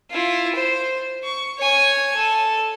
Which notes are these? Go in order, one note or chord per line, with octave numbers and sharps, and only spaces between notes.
E4 F4
C5
C#6
C#5 G#5
A4